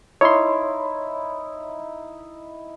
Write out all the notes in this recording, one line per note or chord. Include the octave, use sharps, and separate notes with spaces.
D#4 E4 C#5 C6